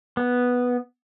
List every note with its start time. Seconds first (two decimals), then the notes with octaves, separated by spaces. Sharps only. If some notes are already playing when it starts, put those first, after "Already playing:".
0.17 B3